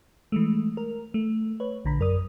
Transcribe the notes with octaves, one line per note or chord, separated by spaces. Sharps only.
E3 G#3 A3
A#4
A3
B4 C#5
A#1 D3 A#5 B5
F#2 A#4 D5 D#6